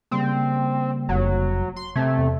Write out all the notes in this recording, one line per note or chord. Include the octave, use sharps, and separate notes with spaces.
C#3 G3 A#3 C4
F1 F#3
C6
C3 A3 G#6
E2